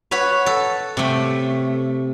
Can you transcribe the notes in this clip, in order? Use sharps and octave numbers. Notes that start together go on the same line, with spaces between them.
B4 C#5 F#5 B5
A4
C3 A3